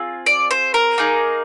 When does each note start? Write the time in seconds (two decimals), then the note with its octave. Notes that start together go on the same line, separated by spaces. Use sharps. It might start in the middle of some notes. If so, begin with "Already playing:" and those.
Already playing: C4 F4 G#4
0.26 D5
0.51 C5
0.74 A#4
0.98 A#3 D#4 G#4